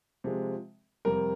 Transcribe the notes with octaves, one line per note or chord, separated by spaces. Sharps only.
C3 F3 G#3
F2 C3 G3 A#4